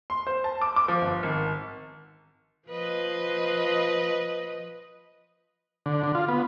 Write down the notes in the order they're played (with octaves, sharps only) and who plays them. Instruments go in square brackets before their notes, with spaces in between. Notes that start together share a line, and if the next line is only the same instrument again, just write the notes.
[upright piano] C6
C5
A5
D6
D6
F3
G1
G#1
[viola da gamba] F3 B4 D#5
[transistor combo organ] D3
D3
F4
B3